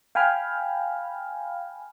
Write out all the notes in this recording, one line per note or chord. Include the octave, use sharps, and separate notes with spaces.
F5 G5 G#5 B5 F6